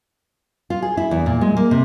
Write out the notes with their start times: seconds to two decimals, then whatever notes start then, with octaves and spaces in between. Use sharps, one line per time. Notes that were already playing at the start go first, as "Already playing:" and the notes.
0.70 F4
0.82 G#4
0.97 E4
1.11 E2
1.26 A#2
1.41 G#3
1.57 A#3
1.71 C3